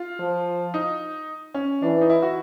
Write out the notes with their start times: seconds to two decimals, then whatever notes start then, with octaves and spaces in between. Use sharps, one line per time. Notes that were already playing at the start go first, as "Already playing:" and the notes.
Already playing: F4
0.19 F3
0.74 D#4
1.54 C#4
1.82 E3 D4
2.01 D#4
2.10 E4
2.22 F#4